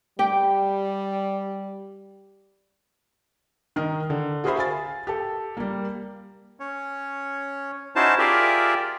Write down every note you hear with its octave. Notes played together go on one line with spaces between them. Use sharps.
G3 G4 G5
D#3 A#4 D#5
D3
F#4 G#4 A#4 C5 E5 B5
F5 G#5 A6
G4 A4
G3 A#3
C#4 C#5
C#4 D#4 E4 F#4 C5 A5
F4 G4 G#4 A#4 D5 E5